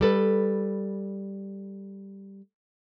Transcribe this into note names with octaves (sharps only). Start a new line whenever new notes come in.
G3 A4 B4